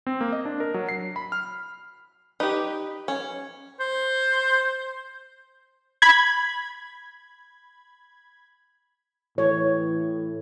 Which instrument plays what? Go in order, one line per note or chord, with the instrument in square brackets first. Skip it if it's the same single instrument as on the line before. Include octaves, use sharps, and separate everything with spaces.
[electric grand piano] C4
A#3
D#5
D4
A#4
F#3
C7
B5
F6
[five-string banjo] D#4 [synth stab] G4 B4
[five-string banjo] C#4
[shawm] C5
[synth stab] B5 G#6
[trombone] A2 [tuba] E3 [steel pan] C#5